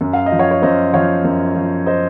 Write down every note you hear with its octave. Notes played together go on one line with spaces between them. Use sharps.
F#2
F5
D#5
F3
C#5 F5
C#5
F#2 C5 D#5
F3 C#5 F5
F#2
F3
C5 D#5